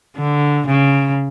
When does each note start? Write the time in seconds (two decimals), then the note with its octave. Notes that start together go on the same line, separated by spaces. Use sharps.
0.17 D3
0.67 C#3